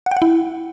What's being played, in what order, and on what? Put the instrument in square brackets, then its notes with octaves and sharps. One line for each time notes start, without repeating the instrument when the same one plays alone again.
[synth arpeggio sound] F#5
G5
F#5
E4